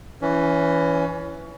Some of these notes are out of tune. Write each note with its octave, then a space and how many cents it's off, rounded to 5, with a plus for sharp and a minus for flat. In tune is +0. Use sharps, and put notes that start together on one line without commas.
E3 +10 C#4 +25